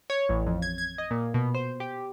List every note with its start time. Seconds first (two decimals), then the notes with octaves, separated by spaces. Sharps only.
0.10 C#5
0.29 A1
0.47 F2
0.62 G#6
0.78 G#6
0.98 D#5
1.11 A#2
1.34 B2
1.55 C5
1.80 G4